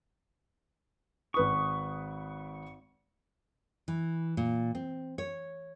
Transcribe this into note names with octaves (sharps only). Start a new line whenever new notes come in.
G#1 B4 C#6 D#6
E3
A#2
C4
C#5